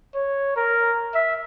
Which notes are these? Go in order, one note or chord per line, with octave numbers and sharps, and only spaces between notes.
C#5
A#4
E5